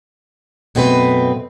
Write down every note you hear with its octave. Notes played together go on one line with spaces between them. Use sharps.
F#2 B2 A3 C4 A4 B4